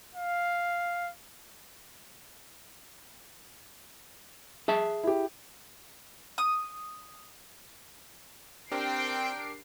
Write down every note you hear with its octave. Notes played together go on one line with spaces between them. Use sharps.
F5
G#4 E5 A5
E4 G4
D#6
C4 D4 G4 A#4 G5 C7 D7